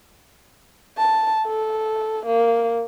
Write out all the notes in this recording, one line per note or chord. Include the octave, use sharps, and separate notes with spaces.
A5
A4
A#3